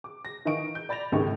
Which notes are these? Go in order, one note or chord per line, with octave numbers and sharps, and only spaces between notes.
D6
A#6
D#3 E3 D#5 F5 C#6 D7
G6
D5 B5 A6 A#6 F7
G#1 C#2 A2 D#3 G4 C#6